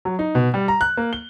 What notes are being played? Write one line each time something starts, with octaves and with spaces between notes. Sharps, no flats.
F#3
D#4
B2
G3
A#5
F#6
A#3
G7